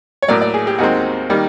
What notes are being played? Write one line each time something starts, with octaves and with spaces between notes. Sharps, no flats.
C#5
A2 F#3 A#3 D5
D5
G#4
G4
D#2 D#3 G#3 C4 F#4
D#3 G3 A#3